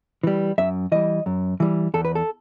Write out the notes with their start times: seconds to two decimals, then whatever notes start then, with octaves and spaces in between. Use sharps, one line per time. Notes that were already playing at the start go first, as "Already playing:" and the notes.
0.24 E3 G3
0.58 F#2 E5
0.92 E3 G3 D#5
1.26 F#2
1.60 E3 G3
1.94 E2 A4
2.05 B4
2.15 A4